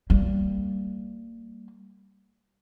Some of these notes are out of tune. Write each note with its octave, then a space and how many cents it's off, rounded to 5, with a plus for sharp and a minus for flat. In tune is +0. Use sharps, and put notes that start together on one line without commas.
G3 -10 A#3 -25